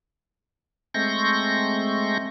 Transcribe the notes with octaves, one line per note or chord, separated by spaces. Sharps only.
G#3 A3 C4 C#6 G6 A#6